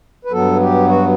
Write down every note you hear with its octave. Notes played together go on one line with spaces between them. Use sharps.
B4
G2 F#3 B3 A4
G4
F#4